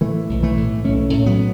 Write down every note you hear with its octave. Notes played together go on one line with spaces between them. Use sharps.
A2 E3 A3
B1
E3 A3
A2
B1 A3 C#4
A2
F#3 B3